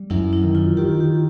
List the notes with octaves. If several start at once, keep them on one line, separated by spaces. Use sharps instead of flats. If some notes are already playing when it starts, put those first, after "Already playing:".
Already playing: G3
F#2 E4
E4
D#3
F4
D#3 G4
G4